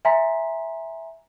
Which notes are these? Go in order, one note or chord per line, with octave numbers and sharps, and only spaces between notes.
E5 G#5 A#5 C6 B6